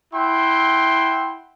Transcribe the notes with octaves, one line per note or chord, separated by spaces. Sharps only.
E4 E5 F#5 G5 C6